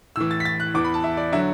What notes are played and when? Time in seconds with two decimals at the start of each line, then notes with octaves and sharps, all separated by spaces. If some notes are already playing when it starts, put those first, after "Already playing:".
0.16 A2 E3 E6
0.31 A6
0.40 B6
0.45 A6
0.60 F#6
0.74 E2 E3 D6
0.84 B5
0.94 A5
1.04 E5
1.17 D5
1.32 D3 F#3 E5